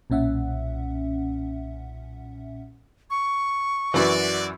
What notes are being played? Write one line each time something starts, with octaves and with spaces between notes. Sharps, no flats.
B1 A#2 C#4 E5 F#5
C#6
F#2 E3 F#4 D5